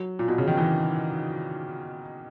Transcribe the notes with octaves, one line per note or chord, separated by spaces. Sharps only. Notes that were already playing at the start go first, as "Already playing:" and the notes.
Already playing: F#3
A#2
B2
C#3
D#3
E3